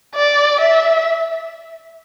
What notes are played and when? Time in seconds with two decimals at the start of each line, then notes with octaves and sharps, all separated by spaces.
0.15 D5
0.61 E5